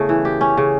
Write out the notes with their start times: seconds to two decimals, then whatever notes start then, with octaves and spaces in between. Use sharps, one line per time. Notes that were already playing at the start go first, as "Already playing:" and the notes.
Already playing: C#3 A3 B3 E4
0.09 E3
0.25 G4
0.41 C#4
0.57 C#3